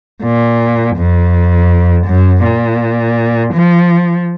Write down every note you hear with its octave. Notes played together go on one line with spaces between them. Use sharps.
A#2
F2
F#2
A#2
F3